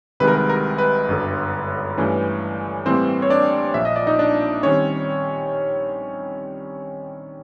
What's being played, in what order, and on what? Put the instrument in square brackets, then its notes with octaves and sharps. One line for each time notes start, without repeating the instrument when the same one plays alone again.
[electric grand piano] C2 C3 D#3 G#3 B4
A#4
B4
A#4
B4
G1 F#2 D3
G2 E3 A3 C#4
A2 E3 G3 A#3 C4 C5
C#5
D4 D5
A#1 A#2 F3 A#3 E5
D#5
D5
D#4 D#5
D4 D5
D#3 G3 C4 C#4 C#5